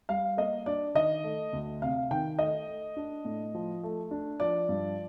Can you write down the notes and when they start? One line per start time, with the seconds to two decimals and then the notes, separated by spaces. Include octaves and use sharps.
0.09 G3 F5
0.37 A#3 D#5
0.66 D4 D5
0.95 D#3 D#5
1.24 A3
1.53 D2
1.82 C3 F5
2.11 D#3 G5
2.39 A3 D#5
2.67 A3
2.96 D4
3.25 A2
3.54 F3
3.83 A3
4.11 D4
4.40 F3 D5
4.69 G2